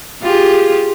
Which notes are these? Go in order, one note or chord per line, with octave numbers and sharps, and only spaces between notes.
F4 G4 G#4